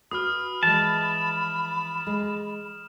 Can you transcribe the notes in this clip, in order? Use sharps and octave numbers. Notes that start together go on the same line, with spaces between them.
F#4 B4 B5 D#6 F6
E3 F3 G#3 A5 E7
G#3